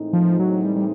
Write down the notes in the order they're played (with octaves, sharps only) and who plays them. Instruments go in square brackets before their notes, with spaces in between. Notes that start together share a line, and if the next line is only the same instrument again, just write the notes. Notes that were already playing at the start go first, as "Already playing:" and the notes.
Already playing: [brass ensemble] A2 E3 G#3 C4 D#4
[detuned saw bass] F3
F#3
G3
G3